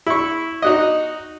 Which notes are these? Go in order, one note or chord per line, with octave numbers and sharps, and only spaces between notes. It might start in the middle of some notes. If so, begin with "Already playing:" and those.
E4 C#6
D#4 F#4 D#5